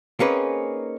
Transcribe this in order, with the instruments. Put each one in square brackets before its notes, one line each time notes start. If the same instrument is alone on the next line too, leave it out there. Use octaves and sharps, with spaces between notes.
[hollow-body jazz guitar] A#3 C4 C#4 D#4 G#4 B4